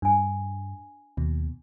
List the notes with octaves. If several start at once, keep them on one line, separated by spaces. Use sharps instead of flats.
G2 D4 G#5
D#2 B2